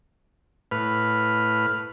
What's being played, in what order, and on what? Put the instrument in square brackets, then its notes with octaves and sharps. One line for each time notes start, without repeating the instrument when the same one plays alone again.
[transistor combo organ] A2 B4 F6